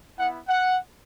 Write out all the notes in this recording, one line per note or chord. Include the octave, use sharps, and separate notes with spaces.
B3 E4 F#5
F#5